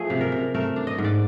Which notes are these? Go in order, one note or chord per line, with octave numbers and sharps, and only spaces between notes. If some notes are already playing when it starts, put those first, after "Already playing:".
Already playing: F3 A3 G#4
C3
A#4
C3
A3 A#4
D4
D#5
G#2
D5